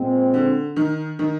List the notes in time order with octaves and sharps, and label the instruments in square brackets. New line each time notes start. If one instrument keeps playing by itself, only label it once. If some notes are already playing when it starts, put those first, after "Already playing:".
Already playing: [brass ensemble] A#2 G#3 C4
[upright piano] D3
D#3
D#3